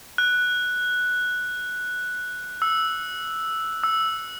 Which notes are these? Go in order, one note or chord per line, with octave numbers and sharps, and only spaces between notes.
F#6
E6
E6